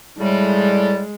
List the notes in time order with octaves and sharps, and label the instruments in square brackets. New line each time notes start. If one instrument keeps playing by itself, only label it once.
[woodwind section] A2 G3 [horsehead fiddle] G#3